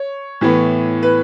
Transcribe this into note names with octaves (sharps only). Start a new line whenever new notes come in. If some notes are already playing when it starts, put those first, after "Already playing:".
Already playing: C#5
A2 E3 B3
B4